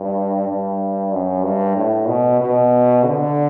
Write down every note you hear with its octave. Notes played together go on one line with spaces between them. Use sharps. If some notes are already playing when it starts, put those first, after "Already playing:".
Already playing: G2
G2
F#2
G2
A2
B2
B2
D3